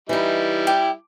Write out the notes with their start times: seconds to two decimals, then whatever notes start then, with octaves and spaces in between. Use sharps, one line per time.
0.09 E3 G3 D#4 E4
0.67 G4